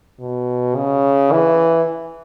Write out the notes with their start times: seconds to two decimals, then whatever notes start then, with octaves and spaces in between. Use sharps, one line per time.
0.20 B2
0.76 C#3
1.32 E3